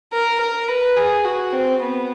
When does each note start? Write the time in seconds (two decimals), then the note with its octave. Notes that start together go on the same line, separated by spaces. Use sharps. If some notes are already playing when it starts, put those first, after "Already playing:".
0.13 A#4
0.40 A#4
0.68 B4
0.96 G#4
1.25 F#4
1.53 C4
1.82 B3